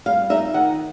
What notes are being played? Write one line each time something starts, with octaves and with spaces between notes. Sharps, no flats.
G3 F5
D#4 E5
D#3 F#5